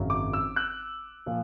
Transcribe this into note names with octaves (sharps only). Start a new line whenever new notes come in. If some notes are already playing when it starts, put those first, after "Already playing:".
Already playing: G#1 F#2 C#3 F#3
D6
E6
F#6
A#2 F3